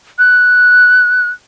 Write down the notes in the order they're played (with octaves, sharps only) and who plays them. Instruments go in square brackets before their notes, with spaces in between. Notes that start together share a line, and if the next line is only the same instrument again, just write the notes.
[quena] F#6